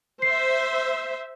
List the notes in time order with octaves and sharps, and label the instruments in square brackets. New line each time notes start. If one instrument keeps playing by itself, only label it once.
[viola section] C5 E5 [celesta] C7